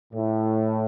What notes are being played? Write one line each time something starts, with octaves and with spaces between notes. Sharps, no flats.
A2